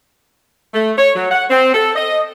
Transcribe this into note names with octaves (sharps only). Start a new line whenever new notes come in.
A3
C#5
F#3
F#5
C4
A4
D#5